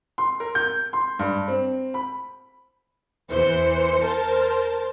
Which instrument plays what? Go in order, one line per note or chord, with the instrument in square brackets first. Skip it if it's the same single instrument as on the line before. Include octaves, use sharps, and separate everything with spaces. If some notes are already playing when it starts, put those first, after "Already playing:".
[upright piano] C6
A#4
G6
C6
G2
C4
B5
[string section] E2 E3 C5 C#7
A#4 C5 A5